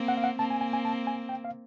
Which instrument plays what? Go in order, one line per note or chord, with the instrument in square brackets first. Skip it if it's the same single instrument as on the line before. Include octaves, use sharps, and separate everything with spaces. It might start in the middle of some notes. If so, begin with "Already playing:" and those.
Already playing: [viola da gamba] A#3 C4
[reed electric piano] F#5
F5
F#5
[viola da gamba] A#3 C4 [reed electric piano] A5
[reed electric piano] G#5
G#5
G#5
A5
G#5
G5
F5